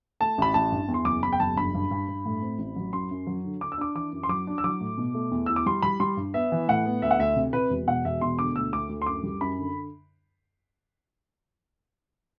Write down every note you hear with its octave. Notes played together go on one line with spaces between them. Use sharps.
A3 A5
A1 B5
A1 A5
G2
E2
C6
F#1 D6
E2 B5
G5
F#1 A5
G2 B5
G2
G2
G2
A2
C4
A1
F#3
F#2 C6
F#2
F#3
D3
D4 D6
E6
D4 D6
E3 D6
F#2
C6
F#3 D6
D4
E6
F#3 D6
A2
B2
A3
E2
E4 E6
D6
G3 C6
G3 B5
G3 C6
G2
B3 E5
E3
A2 F#5
B3
D2 E5
F#5
D2 E5
C3
C3 B4
E1
B2 F#5
E1 E5
B2 C6
D3 D6
D2 E6
D2 D6
D2
C6
F#2 D6
G3
F#2 B5
D3